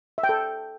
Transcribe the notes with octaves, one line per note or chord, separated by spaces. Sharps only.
E5
G5
A4